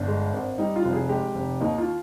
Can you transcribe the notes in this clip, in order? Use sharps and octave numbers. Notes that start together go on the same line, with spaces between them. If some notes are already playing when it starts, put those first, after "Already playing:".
Already playing: G1 D4
G#3
G#1
G3 D#4
F4
F1
G#4
G#3 G4
F1
D#2 D#4
F4